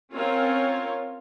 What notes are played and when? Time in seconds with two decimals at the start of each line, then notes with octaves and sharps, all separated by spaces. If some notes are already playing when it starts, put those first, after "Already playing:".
0.13 C4 C#4 F4 A#4 C#5